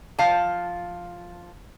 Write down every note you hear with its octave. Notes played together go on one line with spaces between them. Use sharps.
F3 F5 A5